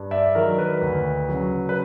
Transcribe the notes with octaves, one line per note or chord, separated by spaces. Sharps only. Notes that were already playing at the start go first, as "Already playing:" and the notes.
Already playing: G2
D5 E5
D#3 F#3 A#4
B4
D2
C#3 F#3
B4